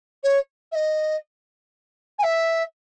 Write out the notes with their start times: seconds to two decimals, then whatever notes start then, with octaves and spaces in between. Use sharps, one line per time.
0.23 C#5
0.72 E5
0.75 D#5
2.19 G#5
2.23 E5